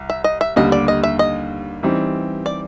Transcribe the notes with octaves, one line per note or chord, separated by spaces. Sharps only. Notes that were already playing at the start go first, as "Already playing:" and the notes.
Already playing: C2
E5
D#5
E5
D#2 D3 G3 D#5
D5
D#5
E5
D#5
E3 G3 C4 D#4
D5